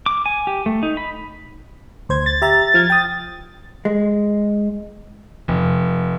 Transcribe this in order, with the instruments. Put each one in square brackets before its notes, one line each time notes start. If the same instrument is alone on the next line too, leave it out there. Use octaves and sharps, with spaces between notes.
[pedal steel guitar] D6
G#5
G4
A3
D#4
B5
[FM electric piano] D2 C5 G#6
[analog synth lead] A6
[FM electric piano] G4 E5 A#5
F3 F6 G#6
G5 D#6
[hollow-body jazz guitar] G#3
[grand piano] F1